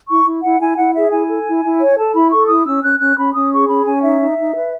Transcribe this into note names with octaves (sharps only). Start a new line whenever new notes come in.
E4 C#6
E4
E4 F#5
E4 G#5
E4 F#5
G#4 E5
E4 G#5
A4
E4
E4
C#5
A4 A5
E4 B5
A4 C#6
E4 D#6
C#4 E6
C#4 F#6
C#4 F#6
C#4 B5
C#4 D#6
G#4 C#6
C#4 B5
C#4 G#5
D#4 E5
D#4
D#4
B4